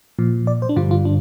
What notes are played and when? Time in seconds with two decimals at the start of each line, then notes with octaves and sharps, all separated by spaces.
0.19 A#2 F3
0.47 D5
0.62 C5
0.69 D4
0.76 G2 D3 G3 F4
0.91 F4
1.05 D4